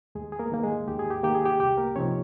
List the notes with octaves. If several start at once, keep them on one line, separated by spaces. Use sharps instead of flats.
D#2 G#3 G#4
G#4
A#3 A#4
D#3 A#3
G#3 G#4
D#2 G4
G#4
G4
D#3 A#3 G4
G#4
G4
C2 G4
A#3 A#4
C3 F3 C4 C#4 D#4 C#5